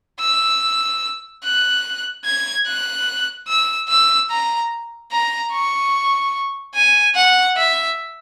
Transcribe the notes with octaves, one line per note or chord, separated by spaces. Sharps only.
E6
F#6
G#6
F#6
E6
E6
A#5
A#5
C#6
G#5
F#5
E5